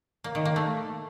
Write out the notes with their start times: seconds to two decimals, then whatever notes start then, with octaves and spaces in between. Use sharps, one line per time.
0.24 A#3
0.35 D#3
0.45 A#3
0.56 A3